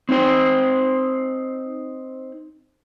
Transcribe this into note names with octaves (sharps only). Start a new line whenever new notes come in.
C4 D#4 C5